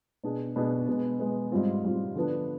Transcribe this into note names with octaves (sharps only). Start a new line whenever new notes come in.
B2 B3 D4 G#4
B2 B3 D4 G#4
B2 G#3 B3
B2 G#3 B3
G#2 G3 C4 F4
G#2 G3 C4 F4
D3 F3 B3 D4